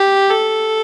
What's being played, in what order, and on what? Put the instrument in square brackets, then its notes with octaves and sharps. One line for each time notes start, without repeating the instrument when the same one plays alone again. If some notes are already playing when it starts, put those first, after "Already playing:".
Already playing: [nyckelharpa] G4
A4